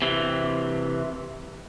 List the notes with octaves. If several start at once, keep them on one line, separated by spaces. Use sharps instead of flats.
C3 E3